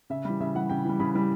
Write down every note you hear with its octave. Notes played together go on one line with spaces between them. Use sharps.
C#3 E5
E3 G3
C#3 E5
E3 G3 F#5
C#3 G5
E3 G3
C#3 B5
E3 G3